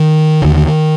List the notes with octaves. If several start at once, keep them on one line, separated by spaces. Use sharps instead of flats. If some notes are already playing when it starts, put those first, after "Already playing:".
Already playing: D#3
D#2 D3